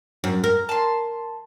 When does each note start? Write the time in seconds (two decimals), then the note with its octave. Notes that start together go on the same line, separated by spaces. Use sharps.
0.24 F#2
0.44 A#4
0.69 A5 C6